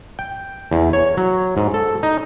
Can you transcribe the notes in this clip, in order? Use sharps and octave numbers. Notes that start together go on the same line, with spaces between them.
G5
E2
C#5
F#3
G#2
A4
D#4